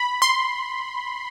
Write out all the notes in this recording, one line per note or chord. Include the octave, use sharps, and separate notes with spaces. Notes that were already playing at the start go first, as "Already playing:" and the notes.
Already playing: B5
C6